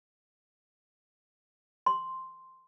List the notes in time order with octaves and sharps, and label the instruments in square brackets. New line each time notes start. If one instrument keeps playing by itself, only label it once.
[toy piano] C6